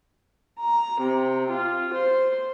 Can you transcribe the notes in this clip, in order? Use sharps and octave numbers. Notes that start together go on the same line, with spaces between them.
A#5
C3
F4
C5